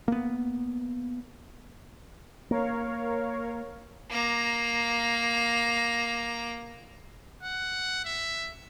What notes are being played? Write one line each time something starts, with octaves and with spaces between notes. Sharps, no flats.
A#3 B3
A#3 A#4 C#5 F5
A#3 A#5
F#5
E5